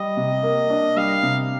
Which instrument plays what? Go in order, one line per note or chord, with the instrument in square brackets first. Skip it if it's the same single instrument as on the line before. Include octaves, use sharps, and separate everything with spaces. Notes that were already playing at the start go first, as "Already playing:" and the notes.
Already playing: [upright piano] G3 [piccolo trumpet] D#5
[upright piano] C3
A#3
D4
[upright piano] G3 [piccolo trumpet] F5
[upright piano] C3